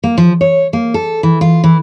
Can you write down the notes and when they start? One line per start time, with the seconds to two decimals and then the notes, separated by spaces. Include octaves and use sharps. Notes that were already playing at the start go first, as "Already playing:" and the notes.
0.04 A#3
0.18 F3
0.41 C#5
0.73 A#3
0.94 A4
1.23 E3
1.41 F4
1.64 E3